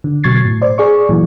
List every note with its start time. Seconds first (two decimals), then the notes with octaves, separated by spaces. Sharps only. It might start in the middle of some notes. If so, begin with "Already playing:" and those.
0.04 D3
0.23 B2 F#3 C#6 G#6 A6 C7
0.45 A2
0.61 C5 D5
0.78 G#4 D5 C#6
1.09 A#2 E3 F#3